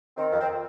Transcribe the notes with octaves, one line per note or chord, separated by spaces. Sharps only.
D#3 C4
F2
C4